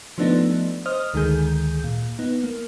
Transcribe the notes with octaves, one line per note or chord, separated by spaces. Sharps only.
F3 A3 B3 D4 D#4
C5 D#5 D#6 F6
D2 D#3 G#3 G#4 G6
A#2
B3 D#4
A#3